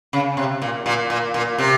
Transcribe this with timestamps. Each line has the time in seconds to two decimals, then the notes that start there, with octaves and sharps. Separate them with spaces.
0.13 C#3
0.37 C3
0.62 A#2
0.86 A#2
1.10 A#2
1.34 A#2
1.58 C3